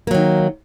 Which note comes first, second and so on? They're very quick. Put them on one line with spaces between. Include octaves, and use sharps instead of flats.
A#3 F#3 D#3